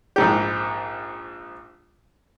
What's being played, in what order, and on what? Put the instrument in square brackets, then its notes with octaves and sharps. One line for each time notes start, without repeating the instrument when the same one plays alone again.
[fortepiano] A#1 G#2 G4